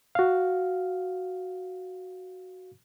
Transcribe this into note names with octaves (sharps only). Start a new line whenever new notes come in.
F#4 F5